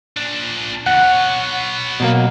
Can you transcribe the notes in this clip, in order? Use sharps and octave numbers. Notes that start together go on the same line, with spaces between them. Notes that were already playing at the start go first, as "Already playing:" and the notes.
A#2 D4
E2 C#3 F#5
B3 C#5
B2 F#3 A#3